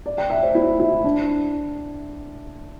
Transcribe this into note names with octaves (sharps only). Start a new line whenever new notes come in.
D5
G5
E5
C5
E4
E4
D4